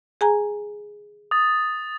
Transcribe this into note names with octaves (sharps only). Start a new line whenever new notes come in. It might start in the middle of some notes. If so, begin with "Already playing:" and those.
G#4 G#5 A#5
D#6 A6